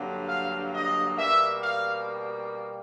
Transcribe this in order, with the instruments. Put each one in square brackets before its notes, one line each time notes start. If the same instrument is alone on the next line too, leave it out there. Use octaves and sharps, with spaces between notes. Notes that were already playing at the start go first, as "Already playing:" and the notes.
Already playing: [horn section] G2 D3 F#3 A#3
F5
D#5
B2 G3 A#3 E5
F5